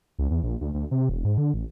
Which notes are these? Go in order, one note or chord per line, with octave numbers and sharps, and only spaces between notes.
C#2
E2
A#1
D2
D2
C3
E1
G#2
D3
A1